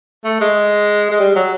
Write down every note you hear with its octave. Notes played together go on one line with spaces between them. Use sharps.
A3
G#3
G#3
G3
F#3